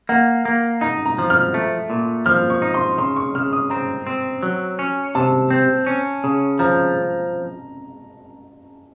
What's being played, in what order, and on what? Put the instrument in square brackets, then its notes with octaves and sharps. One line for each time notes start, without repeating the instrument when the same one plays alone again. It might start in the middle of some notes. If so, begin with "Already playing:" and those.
[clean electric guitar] A#3 [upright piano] F#5
[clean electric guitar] A#3
[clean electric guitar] D#4 [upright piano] A#5
[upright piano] A#5
[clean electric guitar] F3
[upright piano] F6
[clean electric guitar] A3
A#2
[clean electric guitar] F3 [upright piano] F6
[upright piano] C#6
[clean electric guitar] D#4
[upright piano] C6
[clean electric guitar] C#3 [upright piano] C6
[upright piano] C#6
[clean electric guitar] C#3 [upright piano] F6
[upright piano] D#6
[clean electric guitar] C4 [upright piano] A#5
[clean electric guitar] C4
F#3
C#4
[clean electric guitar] C3 [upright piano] A5
[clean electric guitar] C4
C#4
C#3
[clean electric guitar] F3 [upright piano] A#5